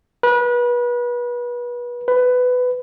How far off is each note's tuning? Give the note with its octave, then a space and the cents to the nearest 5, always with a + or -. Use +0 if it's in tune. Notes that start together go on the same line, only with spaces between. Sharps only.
B4 -30
B4 +15